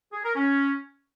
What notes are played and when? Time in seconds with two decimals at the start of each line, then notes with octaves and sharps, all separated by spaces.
0.13 G#4
0.24 A#4
0.36 C#4